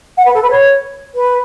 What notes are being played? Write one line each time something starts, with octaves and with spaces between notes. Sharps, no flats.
F#5
B4
A4
B4
C#5
B4